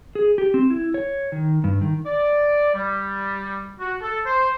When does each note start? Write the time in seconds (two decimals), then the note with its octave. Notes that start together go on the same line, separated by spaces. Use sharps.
0.15 G#4
0.38 G4
0.54 C4
0.70 E4
0.94 C#5
1.32 D#3
1.64 G2
1.82 D#3
2.06 D5
2.75 G3
3.80 F#4
4.01 A4
4.26 C5